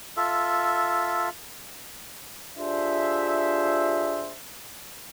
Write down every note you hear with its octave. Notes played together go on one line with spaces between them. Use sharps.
F4 A4 E5
D4 F4 G4 G#4 C5 E5